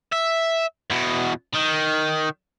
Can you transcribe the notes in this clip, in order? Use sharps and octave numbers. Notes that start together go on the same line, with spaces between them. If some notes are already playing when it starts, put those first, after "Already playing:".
E5
E2 B2
D#3